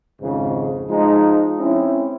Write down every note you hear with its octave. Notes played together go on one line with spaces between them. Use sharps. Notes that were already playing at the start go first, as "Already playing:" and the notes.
G#1 F2 G#2 C#3 F3
F3 G#3 D#4
C4 C#4 E4